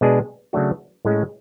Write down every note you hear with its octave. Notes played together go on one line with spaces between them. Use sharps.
B2 G#3 D4 G#4
C#3 F#3 A3 D4 F#4
A2 G#3 C#4